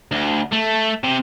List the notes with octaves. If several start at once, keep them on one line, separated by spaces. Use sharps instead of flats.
D2
A3
C3